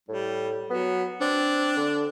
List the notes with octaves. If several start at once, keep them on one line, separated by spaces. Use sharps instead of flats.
A2 G3
F#3 B3
C4 D4
D3